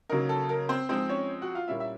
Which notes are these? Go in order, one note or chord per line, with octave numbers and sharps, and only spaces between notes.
C#3 F#3 A#3 D#4 A#4
A4
A#4
C4 C5
F3 G#3 C4 D#4 C5
C#4 C#5
F#4 F#5
F4 F5
A#2 G3 A#3 C#4 E4 E5
E5